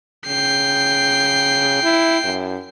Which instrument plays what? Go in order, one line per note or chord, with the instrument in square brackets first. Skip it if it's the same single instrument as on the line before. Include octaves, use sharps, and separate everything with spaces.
[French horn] C#3 [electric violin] G5 C7
[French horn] E4
F#2